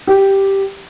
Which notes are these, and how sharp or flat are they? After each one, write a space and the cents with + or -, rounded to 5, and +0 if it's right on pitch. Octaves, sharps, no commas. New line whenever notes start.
G4 -5